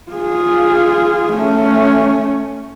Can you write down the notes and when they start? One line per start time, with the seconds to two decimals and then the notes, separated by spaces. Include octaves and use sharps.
0.12 F4 G#4
1.34 A3 C#4